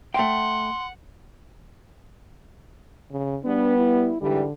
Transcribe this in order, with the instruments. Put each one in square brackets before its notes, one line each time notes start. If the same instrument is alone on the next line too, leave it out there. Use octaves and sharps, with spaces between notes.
[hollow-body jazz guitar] A3 G5 [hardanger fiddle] F#5 [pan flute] C6
[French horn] C#3
[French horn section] G3 B3 [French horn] D4
[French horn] E4
[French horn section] G#2 E3 G3 [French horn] D3